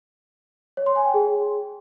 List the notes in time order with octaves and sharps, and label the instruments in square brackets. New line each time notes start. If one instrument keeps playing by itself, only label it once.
[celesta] C#5
C6
G#5
G5
G#4